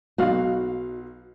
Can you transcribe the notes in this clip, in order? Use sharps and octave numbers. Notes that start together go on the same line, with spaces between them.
B1 D#4 F#4 F5